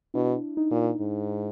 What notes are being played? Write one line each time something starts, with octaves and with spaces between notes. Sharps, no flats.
B2 D4 E4
D#4
A#2
G#2